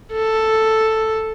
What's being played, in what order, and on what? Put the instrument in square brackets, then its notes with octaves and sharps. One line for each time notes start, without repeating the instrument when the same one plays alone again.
[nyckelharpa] A4